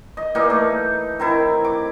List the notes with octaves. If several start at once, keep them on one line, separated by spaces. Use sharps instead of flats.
D#5
E3 G3 A#3 D#4
A3
D#3 C4 E4
D6